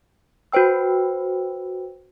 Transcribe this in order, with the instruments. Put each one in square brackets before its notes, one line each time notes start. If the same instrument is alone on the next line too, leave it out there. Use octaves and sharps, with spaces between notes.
[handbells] F#4 B4 C5 G5 E6